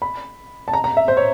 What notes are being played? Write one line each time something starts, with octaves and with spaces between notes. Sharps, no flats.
B5
A5
A#5
A#5
E5
C5
C#5